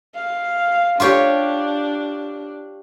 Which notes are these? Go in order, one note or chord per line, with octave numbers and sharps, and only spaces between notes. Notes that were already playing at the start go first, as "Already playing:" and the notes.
F5
D4 F4 G4 C#5